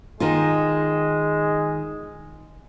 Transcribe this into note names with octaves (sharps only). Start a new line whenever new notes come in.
D#3 G#3 D#4 F4